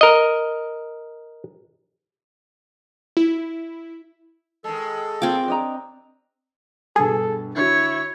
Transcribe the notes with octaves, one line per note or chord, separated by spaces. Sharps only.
A#4 D#5
E4
D#3 G#3 A4
C4 F4 G5 D6
D4 D#5 A#5
G2 B2 G#4 A4
D3 E4 F#4 C#5